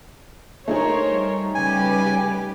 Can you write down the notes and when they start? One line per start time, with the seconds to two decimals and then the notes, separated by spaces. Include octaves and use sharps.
0.68 A3 D#4 G#4 A#4 C5 C#5
1.10 G3
1.55 C#3 G3 G4 B4 G#5